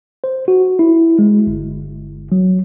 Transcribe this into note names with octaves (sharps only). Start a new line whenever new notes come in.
C5
F#4
E4
G#3
G1
F#3